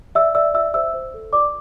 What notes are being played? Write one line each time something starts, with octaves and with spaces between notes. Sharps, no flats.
D5 E5 E6
D5 E5 E6
F4 E5 E6
C5 E5 E6
C5
A4
F4 D5 D6